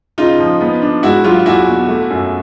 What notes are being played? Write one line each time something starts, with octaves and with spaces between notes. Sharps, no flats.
C#3 D#4 F4
F3
B3
D4
G#2 E4 F#4
F#3 F4 G4
F4
E2 E4 F#4
B2
A3
F#2